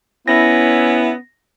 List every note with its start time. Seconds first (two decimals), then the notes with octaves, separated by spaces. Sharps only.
0.28 B3 C#4 E4 A#6